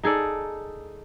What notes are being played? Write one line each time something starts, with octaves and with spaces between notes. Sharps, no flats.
D#4 G#4 A4 D5